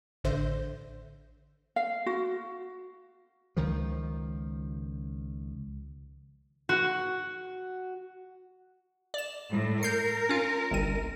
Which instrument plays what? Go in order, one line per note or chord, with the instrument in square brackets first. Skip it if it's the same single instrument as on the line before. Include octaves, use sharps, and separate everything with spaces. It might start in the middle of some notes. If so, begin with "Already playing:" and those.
[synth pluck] A1 D3 C5 E5 G6 A#6
[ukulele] F5
F#4
[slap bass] C#2 D#3 F3
[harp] F#4
[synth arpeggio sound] D5 E7
[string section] A2
[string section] A#4 [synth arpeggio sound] G6 C7
[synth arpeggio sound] C#4 F4
G1 C2 D#7